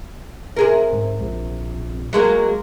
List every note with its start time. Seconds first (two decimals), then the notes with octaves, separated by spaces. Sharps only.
0.56 C3 G#4 A#4
0.93 G#2
1.21 A#1
2.13 F#3 G#3 A#3